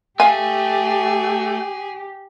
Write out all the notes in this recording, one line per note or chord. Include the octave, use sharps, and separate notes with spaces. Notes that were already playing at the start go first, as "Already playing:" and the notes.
A3 G4 G#4 F5 G#5